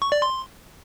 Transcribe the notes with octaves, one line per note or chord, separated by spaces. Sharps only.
C#6
D5
C6